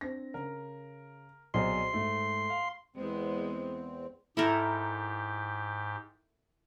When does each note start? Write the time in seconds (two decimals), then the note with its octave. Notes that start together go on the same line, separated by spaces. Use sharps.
0.01 C4 D4 A#6
0.34 C#3 A#4
1.54 B1 C4 G#4 C5 D5 D#5 C6
1.94 G#2 A3
2.50 F5
2.96 E2 G#3 B3 C4
4.37 G#2 E4 G4 A4 A#4